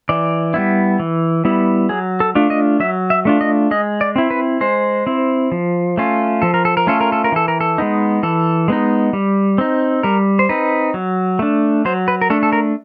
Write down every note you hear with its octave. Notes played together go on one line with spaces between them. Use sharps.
E3 D5
G3 B3 E4
E3
G3 B3 E4
F#3 G#4
A4
A3 D4 F4
D#5
F#3 E5
E5
A3 D4 F4
D#5
G#3 D#5
D5
C4 E4
B4
G#3 C5
C4 E4
F3
A3 C#4 F4
F3 A4
A#4
A4
A#4
A3 C#4 F4 A4
A#4
A4
A#4
E3 A4
A#4
A4
G#3 B3 D#4
E3 A4
G#3 B3 D#4
G3
C4 D#4
G3 A#4
C5
C4 D#4 B4
F#3
A3 D4
F#3 C5
B4
A#4
A3 D4 A4
A4
A#4